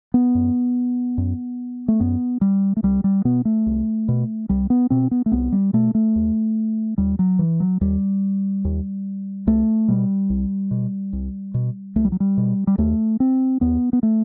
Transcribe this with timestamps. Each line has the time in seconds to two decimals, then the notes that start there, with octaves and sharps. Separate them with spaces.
0.14 B3
0.35 F#2
1.18 F#2
1.88 A3
2.00 F#2 B3
2.41 G3
2.77 A3
2.83 C2 G3
3.04 G3
3.25 B2 B3
3.45 A3
3.66 C2
4.08 B2
4.49 C2 G3
4.70 B3
4.90 B2 C4
5.11 B3
5.26 A3
5.32 C2 B3
5.52 G3
5.73 B2 A3
5.95 A3
6.16 D#2
6.98 D#2 G3
7.19 F#3
7.39 E3
7.60 F#3
7.81 D#2 G3
8.65 D#2
9.47 C2 A3
9.88 B2 G3
10.30 C2
10.71 B2
11.13 C2
11.54 B2
11.96 C2 A3
12.05 G3
12.12 F#3
12.20 G3
12.37 B2
12.67 G3
12.78 D#2 A3
13.20 C4
13.61 D#2 B3
13.93 B3
14.03 A3